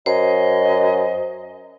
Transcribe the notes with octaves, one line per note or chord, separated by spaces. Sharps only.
F#2 C5 D#5